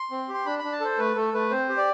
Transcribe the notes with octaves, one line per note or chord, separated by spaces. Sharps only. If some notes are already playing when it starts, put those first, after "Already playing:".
Already playing: C6
C4
G4
C6
D4 B5
D4 B5
A5
A4 C5
A3 B4
A3 A4
A3 B4
C4 C5
G4
D5